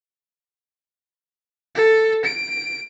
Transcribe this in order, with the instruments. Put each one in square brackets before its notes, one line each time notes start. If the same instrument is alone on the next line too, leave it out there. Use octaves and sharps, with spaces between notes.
[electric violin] A4
D7